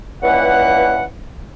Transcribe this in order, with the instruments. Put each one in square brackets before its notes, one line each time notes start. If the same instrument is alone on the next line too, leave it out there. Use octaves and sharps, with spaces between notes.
[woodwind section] C#2 G2 C#3 E3 A#3 F#5